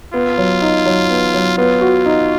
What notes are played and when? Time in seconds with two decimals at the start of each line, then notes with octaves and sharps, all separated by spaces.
0.14 B3 F4
0.38 F#3
0.62 D#4
0.86 F#3
1.10 B3
1.34 F#3
1.57 B3 F4
1.81 F#4
2.06 D#4